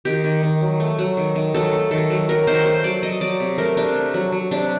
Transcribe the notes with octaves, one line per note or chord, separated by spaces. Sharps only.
D#3 G4
D#3
D#3
F#3
A3
F#3
D#3
D#3
F#3 A4
A3
D#3 A4
F#3
F#3 A#4
D#3 C5
A3 C5
F#3 D5
F#3 D#5
F#3 D5
C3
A3 A#4
C3 D4
A3
F#3
F#3
C3 D4